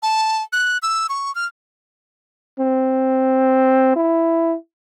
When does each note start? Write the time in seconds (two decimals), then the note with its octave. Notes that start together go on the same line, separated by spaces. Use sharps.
0.03 A5
0.53 F#6
0.82 E6
1.09 C#6
1.35 F6
2.60 C4
3.96 E4